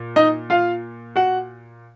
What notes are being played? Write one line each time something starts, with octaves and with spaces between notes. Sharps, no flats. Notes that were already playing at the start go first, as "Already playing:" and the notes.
Already playing: A#2
D#4 D#5
F4 F5
F#4 F#5